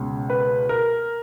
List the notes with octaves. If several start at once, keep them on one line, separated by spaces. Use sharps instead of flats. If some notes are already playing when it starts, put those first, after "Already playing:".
Already playing: C#2 B2 G#3 C#4
B4
A#4